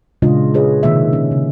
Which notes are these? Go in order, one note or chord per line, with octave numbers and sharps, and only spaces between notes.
A#2 C#3 G#3 D4 F4 D#5
F4 G#4 B4 C#5 D#5
C3 D#3 A#3 D#5 E5
C#4
C#3